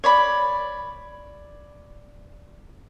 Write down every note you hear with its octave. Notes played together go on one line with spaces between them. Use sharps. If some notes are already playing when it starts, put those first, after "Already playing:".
C#5 D5 B5